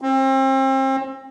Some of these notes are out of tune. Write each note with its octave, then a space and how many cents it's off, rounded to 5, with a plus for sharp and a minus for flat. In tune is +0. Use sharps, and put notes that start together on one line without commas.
C4 +35